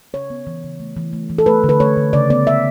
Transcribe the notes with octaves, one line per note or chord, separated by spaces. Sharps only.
C#3 C#5
B3
E3
C#3
A3
E3
A3
E3
A4
A3 B4
D3
B4
A3 C#5
D3
C#3 D5
B3 D5
G#3 E5